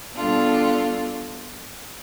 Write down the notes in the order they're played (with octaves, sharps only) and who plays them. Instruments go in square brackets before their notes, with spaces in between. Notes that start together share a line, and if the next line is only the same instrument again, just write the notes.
[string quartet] B2 G3 D4 F4 A4